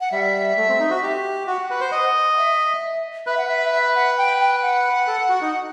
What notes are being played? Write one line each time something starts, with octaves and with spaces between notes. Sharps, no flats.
F#5
G3 E5
A3
C4
D#4
F#4
G4
F#4 F#5
B4
C5
D#5
E5
B4 E5
F#5
E5
E5
F#5
G5
G5
F#5
A4
F#4
D#4